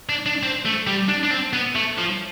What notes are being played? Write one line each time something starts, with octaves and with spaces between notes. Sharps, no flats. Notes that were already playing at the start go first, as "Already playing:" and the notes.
D4
D4
C4
A3
G3
D4
D4
C4
B3
A3
F3